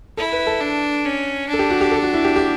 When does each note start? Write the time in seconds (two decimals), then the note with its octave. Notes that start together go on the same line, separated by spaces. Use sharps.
0.17 E4 A4
0.33 B4
0.47 A4
0.61 D4
1.05 C#4
1.49 D4 A4
1.59 G4
1.70 F#4
1.81 G4
1.91 A4
2.03 F#4
2.14 E4
2.24 G4
2.36 G4